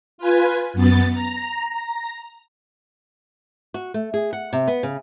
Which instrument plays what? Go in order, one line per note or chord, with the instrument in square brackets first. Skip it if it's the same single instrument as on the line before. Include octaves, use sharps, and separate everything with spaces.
[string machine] F4 B4 G#5
F#2 B3 A6
A#5
[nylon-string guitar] F#4
A3
G#4
F#5
C3
B3
C#3